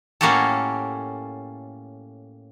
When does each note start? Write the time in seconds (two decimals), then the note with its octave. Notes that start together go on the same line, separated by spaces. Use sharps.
0.21 A2 A#3 C#4 F#4 G4 A4